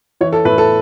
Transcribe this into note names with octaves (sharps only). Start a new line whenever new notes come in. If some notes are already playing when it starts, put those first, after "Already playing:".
E3 C#5
A4
A2 B4
A4